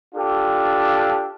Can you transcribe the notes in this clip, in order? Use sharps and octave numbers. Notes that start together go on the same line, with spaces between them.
D4 F4 G4 A4